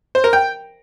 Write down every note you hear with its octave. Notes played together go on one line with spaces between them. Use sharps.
C5
A#4
G5